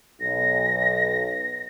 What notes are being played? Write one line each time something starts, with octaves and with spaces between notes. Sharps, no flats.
B1 A#6